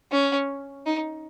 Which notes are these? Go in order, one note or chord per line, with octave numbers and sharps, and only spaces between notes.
C#4
D#4